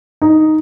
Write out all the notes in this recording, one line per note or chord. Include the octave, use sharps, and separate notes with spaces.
D#4